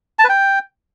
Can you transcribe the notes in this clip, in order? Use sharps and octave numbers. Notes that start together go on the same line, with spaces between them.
A5
B4
G5